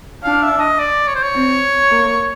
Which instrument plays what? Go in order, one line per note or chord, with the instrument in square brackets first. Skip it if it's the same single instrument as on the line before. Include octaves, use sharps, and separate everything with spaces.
[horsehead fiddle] D4 [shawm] F5
[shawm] E5
D#5
D5
C#5
C5
C#5
[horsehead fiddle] C4
A#3